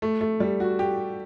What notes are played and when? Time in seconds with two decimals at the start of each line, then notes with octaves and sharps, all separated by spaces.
0.02 A3
0.21 A3
0.40 G3
0.60 F#4
0.79 G4